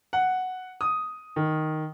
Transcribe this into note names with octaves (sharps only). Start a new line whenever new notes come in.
F#5
D#6
D#3